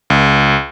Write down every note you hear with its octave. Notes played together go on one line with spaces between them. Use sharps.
C#2